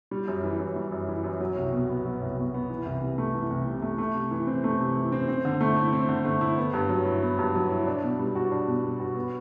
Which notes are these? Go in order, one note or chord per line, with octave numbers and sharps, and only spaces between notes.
G3
F#2
E3
F#2
G3
F#2
E3
F#2
F#3
C2
B2
B3
F#3
C2
B2
B3
E3
C2
C3
A3
E3
C2
C3
A3
A3
C3
E3
C4
A3
C3
E3
C4
C4
D3
A3
E4
C4
D3
A3
E4
B3
G2
F#3
E4
B3
G2
F#3
E4
D4
B2
G3
F#4
D4
B2
G3
F#4
B3